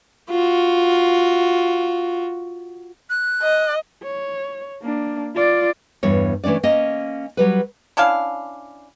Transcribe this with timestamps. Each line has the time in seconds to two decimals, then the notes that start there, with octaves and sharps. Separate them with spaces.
0.30 F4 F#4
3.10 F#6
3.42 D#5
4.03 C#5
4.82 A#3 D4
5.35 F4 D5
6.03 E2 G2 C#5
6.44 E3 A3 C#4 D4 D5
6.63 A#3 C#4 D#5
7.37 F#3 G3 B4
7.97 C#4 D4 E4 F5